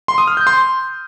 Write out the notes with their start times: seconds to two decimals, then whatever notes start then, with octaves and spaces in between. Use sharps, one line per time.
0.08 C6
0.18 D#6
0.28 F6
0.37 G6
0.47 C6